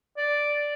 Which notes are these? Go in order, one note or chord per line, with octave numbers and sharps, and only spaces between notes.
D5